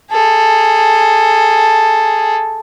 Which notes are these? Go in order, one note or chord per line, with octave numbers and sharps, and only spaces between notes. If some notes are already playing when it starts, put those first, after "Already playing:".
G#4 A4